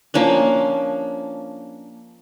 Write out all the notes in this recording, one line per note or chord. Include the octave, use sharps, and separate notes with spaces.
F3 A#3 C#4 D4